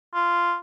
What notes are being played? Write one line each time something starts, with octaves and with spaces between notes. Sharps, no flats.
F4